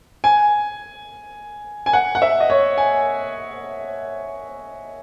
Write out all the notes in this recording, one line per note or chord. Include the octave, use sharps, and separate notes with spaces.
G#5
G#5
F#5
F#5
E5
D#5
C#5
G#5